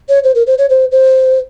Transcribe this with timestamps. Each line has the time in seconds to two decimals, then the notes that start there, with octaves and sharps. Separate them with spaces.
0.09 C#5
0.24 C5
0.35 A#4
0.47 C5
0.58 C#5
0.70 C5
0.92 C5